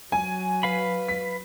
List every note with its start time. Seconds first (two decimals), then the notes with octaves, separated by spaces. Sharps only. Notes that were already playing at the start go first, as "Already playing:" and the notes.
0.12 F#3 G#5
0.63 B4 F5 B5
1.08 B6